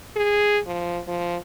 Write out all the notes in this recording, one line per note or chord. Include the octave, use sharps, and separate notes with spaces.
G#4
F3
F3